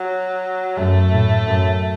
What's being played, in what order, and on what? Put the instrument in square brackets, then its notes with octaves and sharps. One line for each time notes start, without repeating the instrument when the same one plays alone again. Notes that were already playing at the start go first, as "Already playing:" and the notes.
Already playing: [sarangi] F#3
[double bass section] F#2 [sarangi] A3
[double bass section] A2
F#2